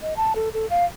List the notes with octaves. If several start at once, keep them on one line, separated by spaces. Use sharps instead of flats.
D#5
A5
A4
A4
F5